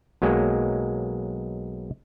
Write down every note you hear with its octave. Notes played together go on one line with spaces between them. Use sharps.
B1 F#3 G#3 A#3